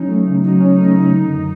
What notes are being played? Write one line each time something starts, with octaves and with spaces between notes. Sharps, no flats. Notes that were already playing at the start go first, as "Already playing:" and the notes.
Already playing: F#3 C#4 D#4
A3
C#3
F#3 D#4
C#4
A3
C#3
D3
F#2